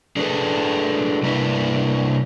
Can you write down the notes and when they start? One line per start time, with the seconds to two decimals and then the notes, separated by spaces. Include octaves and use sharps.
0.16 D4 G#4 A4 B4
1.23 C3 G3 A#3 D4 E4 B4